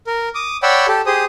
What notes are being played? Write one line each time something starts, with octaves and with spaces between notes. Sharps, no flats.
A#4
D6 D#6
C#5 D5 F#5 G5 B5 E6
G4 A4
G4 G#4 C5 D#6